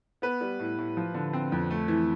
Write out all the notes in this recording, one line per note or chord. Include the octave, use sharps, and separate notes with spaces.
B3 B4
G3
A2
A2
F3
D3
C4
F2
A3
E3